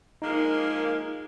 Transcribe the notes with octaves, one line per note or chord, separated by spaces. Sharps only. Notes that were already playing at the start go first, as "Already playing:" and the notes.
F3 G#3 A#3 D#4